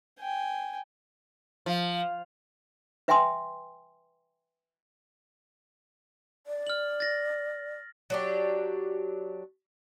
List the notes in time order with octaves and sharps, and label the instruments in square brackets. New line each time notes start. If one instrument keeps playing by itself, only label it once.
[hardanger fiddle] G5 G#5
[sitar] F3
[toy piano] B4 E5 G5 G#5 C6 D#6
[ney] D5
[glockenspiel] F6 F#7
A6 A#6
[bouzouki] F#3 D4 G4